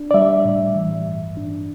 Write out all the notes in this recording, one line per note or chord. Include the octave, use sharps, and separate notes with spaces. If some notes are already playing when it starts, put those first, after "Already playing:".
Already playing: D4
D5
G3 E5
A2
E3
G2
D4